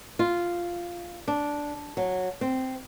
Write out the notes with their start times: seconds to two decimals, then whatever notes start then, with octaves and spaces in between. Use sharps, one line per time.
0.19 F4
1.28 D4
1.97 F#3
2.41 C4